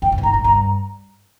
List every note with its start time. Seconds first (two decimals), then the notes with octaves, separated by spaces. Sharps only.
0.02 E2 G5
0.12 G2
0.18 A#2
0.23 G#2 A#5
0.34 A#2
0.44 G2 A#5